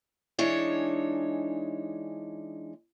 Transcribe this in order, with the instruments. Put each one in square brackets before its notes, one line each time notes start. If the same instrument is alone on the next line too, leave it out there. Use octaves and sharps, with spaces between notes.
[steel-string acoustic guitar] E3 G#3 D4 D#4 C#5